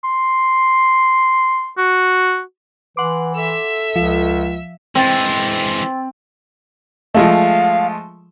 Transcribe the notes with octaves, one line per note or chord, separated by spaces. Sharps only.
C6
F#4
E3 B4 F#5 C6 D6
A4 E5 E6
C#2 F3
E3 G#3 C4 G5 A6
F3 G#3 A3 F5